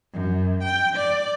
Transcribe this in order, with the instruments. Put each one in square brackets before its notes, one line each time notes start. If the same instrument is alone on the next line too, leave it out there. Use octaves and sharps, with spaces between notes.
[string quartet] F#2
G5
D5